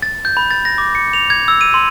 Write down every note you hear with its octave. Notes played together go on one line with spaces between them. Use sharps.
A6
G6
B5
A6
A#6
D6
C#7
F7
G#6
E6
D#7
C6